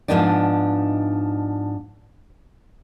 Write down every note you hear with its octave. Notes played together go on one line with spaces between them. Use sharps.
G#2 F3 B3 D4 D#4 D5